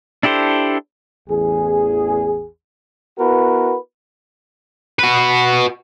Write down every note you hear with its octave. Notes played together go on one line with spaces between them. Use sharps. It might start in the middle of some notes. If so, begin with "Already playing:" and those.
D4 E4 G4 A4 C5
A1 E2 G#4
B3 E4 F#4 A#4 B4
F#4 B4